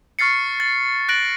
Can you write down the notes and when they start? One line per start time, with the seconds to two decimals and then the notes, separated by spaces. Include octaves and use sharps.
0.19 C#6 F6 A6 C7 C#7
0.60 A6
1.09 F#6 A#6 D7 F#7